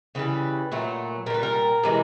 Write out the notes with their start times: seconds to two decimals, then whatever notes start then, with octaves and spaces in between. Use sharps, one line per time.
0.15 C#3 E3 G3 B4
0.72 A#2 F#3 A3
1.26 A#2 A#4
1.30 G3 B4
1.43 A#4
1.83 C3 E3 G#3